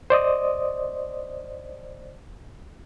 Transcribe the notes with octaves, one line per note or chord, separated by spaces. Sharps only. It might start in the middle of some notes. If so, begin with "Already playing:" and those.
C5 D5 D#5 D#6